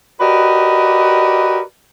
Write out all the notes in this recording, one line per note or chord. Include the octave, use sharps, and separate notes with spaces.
F#4 G4 A#4 B4 D5 D#5